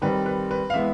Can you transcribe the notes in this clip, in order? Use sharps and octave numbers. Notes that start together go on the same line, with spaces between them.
D#3 G3 C4 B4
B4
B4
F5
E3 G#3 B3 E5